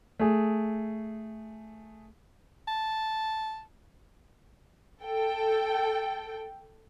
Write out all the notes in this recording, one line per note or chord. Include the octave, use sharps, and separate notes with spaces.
A3 G#4
A5
A4 G5